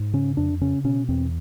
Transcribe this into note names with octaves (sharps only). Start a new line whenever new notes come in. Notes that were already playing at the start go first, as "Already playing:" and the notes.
Already playing: G#2
C#3 C#4
F2 D4
C#3 C#4
B2 C#4
E2 C4